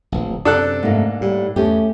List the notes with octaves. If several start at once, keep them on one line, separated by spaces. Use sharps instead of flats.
D1 A#1
F#2 C3 D4 A4 F#6
G#2 A3 A#3
A2 G3
E2 A3 C#4 G4